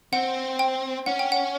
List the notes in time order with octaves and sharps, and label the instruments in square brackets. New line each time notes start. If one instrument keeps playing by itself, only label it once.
[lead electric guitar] C4 [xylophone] F#5
[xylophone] G5
[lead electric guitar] C#4 [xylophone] F#5
[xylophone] G5
F#5